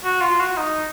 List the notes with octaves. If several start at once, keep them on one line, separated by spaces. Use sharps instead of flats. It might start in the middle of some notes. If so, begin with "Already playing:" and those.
F#4
F4
F#4
D#4